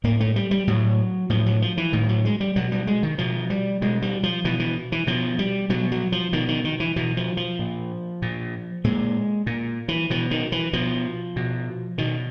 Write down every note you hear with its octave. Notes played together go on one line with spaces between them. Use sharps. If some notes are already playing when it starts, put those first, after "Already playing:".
A2 A#3
A3
G3
G3
A2 F#3
A2 F3
F#3
F3
E3
A2 D#3
F#3
G#3
G3
B2 F#3
G3
G#3
D#3
B2 F3
G3
B2 G#3
G3
F3
B2 E3
E3
E3
B2 F3
G3
B2 F#3
F#3
F3
B2 D#3
D#3
D#3
E3
B2 E3
F3
F3
A#2
A#2
A#2 G#3
A#2
E3
B2 E3
D#3
E3
B2 F3
B2
B2 D#3